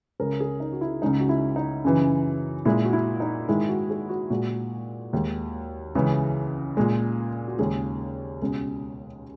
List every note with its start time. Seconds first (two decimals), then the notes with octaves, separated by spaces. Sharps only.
0.20 C#2 C#3 G#3 A#4
0.40 G#4
0.60 D#4
0.72 F#4
0.81 E4
1.02 C#2 C#3 G#3 D#4
1.20 F#4
1.29 E4
1.56 D#4
1.84 F#2 C#3 E3
2.65 A#2 G#3 E4
2.85 F#4
2.93 E4
3.20 D#4
3.49 G#2 D#3 G#3 E4
3.69 F#4
3.90 G#4
4.09 F#4
4.30 A#2 G#3 F#4
5.13 D#2 D#3 G#3
5.95 C#2 C#3 E3 G#3
6.77 A#2 G#3
7.48 F#4
7.58 D#2 C#3 G#3 G#4
8.42 C#2 B2 G#3